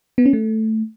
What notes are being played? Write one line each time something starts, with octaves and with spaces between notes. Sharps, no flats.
B3
C#4
A3